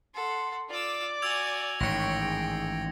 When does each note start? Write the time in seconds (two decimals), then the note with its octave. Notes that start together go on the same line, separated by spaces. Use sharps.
0.14 A4 F#5 C6
0.69 F4 D5 D6 E6
1.22 F#4 G#5 E6 G#6 F7
1.80 A1 G#2 D#3 C#5 G5 A#6 C#7
2.23 G#4